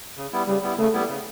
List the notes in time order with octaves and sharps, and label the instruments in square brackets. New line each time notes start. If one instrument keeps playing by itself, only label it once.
[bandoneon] C#3
G3 B3 E4
[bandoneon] C#3 [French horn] G3
[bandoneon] G3 B3 E4
[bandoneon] C#3 [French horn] A3
[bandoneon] G3 B3 E4
C#3